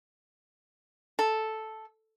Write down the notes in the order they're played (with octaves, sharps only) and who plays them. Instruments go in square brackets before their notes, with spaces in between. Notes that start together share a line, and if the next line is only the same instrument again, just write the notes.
[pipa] A4